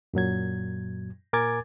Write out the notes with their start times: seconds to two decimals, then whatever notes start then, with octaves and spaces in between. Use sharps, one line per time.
0.14 F#2 A#2 F#3 G#6
1.33 A#2 A#4 G#5 D6 G#6 A6